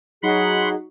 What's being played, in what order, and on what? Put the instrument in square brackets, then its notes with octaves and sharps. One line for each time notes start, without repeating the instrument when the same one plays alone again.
[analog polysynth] F#3 D#4 F#4 [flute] G#4 [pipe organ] F#5 B5 C6